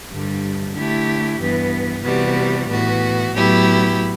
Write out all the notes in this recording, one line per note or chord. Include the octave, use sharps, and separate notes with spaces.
G2 D3 G3
D3 A3 E4 G4
G2 E3 B3
C3 E3 G3 B3 F#4
A2 E3 B3 F#4
A2 F#3 B3 E4 G4